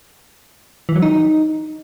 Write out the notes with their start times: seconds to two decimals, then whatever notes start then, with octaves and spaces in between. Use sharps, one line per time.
0.89 E3
0.96 F#3
1.02 D#4